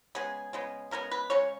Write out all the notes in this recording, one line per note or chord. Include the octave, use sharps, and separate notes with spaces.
C#3 G#3 B3 G#4
C#3 G#3 B3
C#3 G#3 B3 A#4
B4
C#3 G#3 C#5